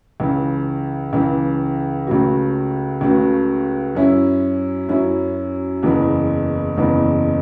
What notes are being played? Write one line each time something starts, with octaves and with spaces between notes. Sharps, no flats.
C#2 C#3 E3
C#2 C#3 E3
C#2 C#3 A3 F#4
C#2 C#3 A3 F#4
F#2 F#3 C#4 E4
F#2 F#3 C#4 E4
F#1 E2 C#3 E3 B3
F#1 E2 C#3 E3 B3